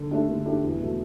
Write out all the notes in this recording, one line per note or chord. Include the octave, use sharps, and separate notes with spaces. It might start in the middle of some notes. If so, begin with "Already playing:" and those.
Already playing: D3
A3 D4 G4
D3
A3 D4 G4
E2
B2 A3